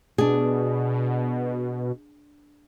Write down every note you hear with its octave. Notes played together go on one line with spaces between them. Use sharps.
B2 D4 G#4